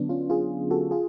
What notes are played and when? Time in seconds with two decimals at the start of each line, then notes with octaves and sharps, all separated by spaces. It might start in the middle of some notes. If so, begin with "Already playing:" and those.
Already playing: D3 F#3 B3 D4
0.09 C#4 F4
0.30 F4 G#4
0.71 F#4 A4
0.91 F4 G#4